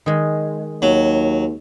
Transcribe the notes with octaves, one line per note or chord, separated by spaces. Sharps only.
D#3 G#3
D#2 F#3